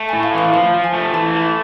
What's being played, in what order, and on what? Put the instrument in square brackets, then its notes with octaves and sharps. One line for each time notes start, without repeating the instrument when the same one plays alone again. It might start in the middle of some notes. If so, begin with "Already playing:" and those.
Already playing: [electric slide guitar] A3
[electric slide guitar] A2 [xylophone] G#5
[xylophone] F5
[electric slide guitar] E3 [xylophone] F5
[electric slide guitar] F3 [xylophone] F5
[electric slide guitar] F3
[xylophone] G#5
[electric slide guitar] A3
[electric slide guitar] E3 [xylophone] A5
[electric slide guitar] A3